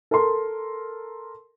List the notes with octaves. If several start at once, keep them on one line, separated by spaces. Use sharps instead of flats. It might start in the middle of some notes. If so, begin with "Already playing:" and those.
A4 A#4 C6